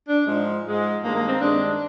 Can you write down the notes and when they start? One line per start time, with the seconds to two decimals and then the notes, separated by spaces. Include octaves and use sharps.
0.09 D4
0.27 G#2 F3 G#3
0.66 G#2 F3 G#3
1.03 G2 D#3 G#3 A#3
1.16 A#3
1.28 C4
1.41 G2 D#3 G#3 D4